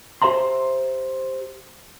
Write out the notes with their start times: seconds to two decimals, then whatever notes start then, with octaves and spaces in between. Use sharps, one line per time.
0.22 G4 C5 E5 A#5 C6